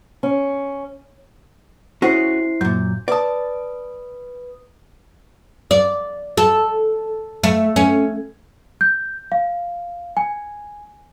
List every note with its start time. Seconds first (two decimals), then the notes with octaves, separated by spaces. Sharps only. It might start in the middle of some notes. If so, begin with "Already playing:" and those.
0.23 C#4
2.02 C#4 E4 F#4 G#4 C5 C7
2.61 F#2 A#2 G6
3.08 B4 D5 A5 D#6
5.71 D5
6.37 A4
7.43 A3
7.76 C#4
8.81 G6
9.32 F5
10.17 G#5